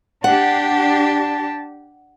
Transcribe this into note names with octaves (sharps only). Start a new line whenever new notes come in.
D4 G4 F#5 A5